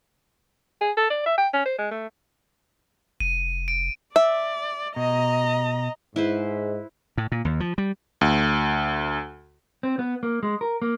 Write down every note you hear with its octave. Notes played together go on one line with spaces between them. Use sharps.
G#4
A4
D5
E5
G5
C#4
C5
G#3
A3
F1 D#7
D7
D5 E5
B2 D#5 A#5
G#2 E4 B4 C5
A2
A#2
D#2
F3
G3
D2
C4
B3
A#3
G#3
A#4
A#3